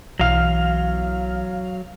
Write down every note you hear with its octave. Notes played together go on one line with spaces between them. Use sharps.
B1 E3 F#3 F5 F6